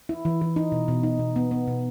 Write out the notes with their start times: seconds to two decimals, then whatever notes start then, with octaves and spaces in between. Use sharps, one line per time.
0.09 E4
0.25 E3
0.41 E3
0.56 D#4
0.72 B2
0.88 B2
1.03 D#4
1.19 B2
1.36 B3
1.51 B3
1.67 B2